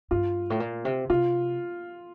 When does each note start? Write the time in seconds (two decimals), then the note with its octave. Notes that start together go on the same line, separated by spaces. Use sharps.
0.11 G2 F4
0.50 A2
0.60 A#2
0.85 C3
1.10 C3 F4